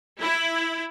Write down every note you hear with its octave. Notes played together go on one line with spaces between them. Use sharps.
E4